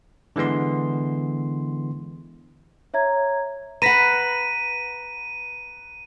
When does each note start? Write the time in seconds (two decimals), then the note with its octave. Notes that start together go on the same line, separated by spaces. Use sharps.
0.36 D3 E3 G#3 B3 C6
2.94 C#5 E5 A#5 G#6
3.82 B4 F#5 A#5 A#6 B6 D#7